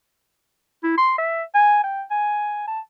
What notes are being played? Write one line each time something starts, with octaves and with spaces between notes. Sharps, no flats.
E4
C6
E5
G#5
G5
G#5
A5